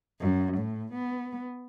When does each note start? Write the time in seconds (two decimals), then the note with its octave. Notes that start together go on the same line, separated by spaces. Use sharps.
0.21 F#2
0.56 A2
0.94 B3